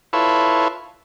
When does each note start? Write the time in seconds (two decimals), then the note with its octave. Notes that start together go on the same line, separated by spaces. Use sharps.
0.13 E4 F4 A4 B4 C#5